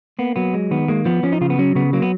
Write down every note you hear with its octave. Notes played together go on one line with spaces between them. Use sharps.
A#3 B3
F#3 B3
G#3
D#3 B3
G#3 A#3
F3 B3
F3 C#4
D#4
C#3 F4
B3
F#3 C#4
C#3 B3
F#3 A#3
B3